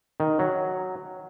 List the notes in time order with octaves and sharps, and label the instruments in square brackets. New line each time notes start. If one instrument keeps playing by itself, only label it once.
[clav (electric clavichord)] D#3
F#3